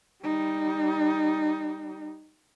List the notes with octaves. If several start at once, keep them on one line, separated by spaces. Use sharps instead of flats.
G3 D#4